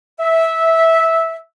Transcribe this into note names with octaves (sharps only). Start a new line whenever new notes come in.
E5